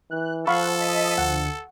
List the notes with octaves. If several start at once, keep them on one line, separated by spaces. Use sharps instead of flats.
E3 F#6
F3 A4 C5 F5 F#5 B5 C#6
D#5 B6 D#7
D2 F#5 C#7